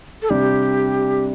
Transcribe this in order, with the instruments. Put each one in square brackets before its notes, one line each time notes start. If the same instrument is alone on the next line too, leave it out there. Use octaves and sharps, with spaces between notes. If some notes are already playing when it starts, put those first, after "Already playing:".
[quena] A4
[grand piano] C3 G3 D4 [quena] G4